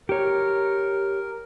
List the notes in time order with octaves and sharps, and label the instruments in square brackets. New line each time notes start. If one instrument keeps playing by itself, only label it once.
[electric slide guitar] G4 C#5 [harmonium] A#4